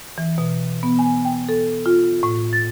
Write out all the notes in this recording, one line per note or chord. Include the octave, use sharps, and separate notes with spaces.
E3
B2
B3
G#5
G5
A4
F4
A2
A6